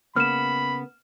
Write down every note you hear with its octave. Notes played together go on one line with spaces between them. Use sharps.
C#3 A#3 B3 B5 F6 E7